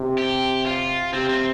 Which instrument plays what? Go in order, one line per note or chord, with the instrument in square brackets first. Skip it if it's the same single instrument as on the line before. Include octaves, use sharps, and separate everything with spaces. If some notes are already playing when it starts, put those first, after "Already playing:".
Already playing: [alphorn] C3
[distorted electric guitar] G4
F4
[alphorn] C3 [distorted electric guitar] C4
[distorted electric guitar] C4